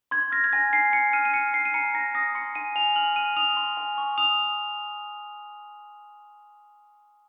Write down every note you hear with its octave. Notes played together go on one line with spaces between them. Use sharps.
C6 G#6
F6 A#6
G#6
G#5 A#6
G#5 C7
G#5 C#7
F6 D#7
D#7
F6 C#7
G#5 C7
D#7
A#5 C#7
A#5 A#6
D#6 A#6
C6 C#7
G#5 D#7
G#5 F7
F6 F#7
F6 D#7
D#6 F7
C6
G#5
C#6
D#6 F7